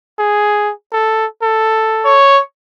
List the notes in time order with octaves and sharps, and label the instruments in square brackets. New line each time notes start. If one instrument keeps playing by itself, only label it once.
[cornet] G#4
A4
A4
[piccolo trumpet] C#5